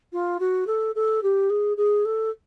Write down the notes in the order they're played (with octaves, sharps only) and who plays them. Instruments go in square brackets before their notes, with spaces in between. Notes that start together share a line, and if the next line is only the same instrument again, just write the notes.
[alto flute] F4
F#4
A4
A4
G4
G#4
G#4
A4